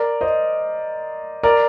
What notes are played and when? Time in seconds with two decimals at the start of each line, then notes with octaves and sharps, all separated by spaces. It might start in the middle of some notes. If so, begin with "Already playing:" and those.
Already playing: A#4 D5
0.21 C5 D#5
1.43 A#4 D5